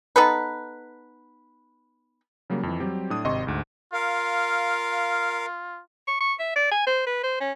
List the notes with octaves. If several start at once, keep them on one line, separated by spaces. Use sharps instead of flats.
B3 D#4 A4 B4
C#3 F#3 G3 A#3
F2 E3
F#3 G3 C4 G4
A2 D4 D#6
G#1 C3 D#5 C6 C#6
D2 G#2
F4 A#4 F5
C#6
C#6
E5
D5
G#5
C5
B4
C5
C#4